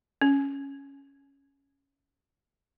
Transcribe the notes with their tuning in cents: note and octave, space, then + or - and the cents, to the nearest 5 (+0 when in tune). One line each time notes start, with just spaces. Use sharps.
C#4 +0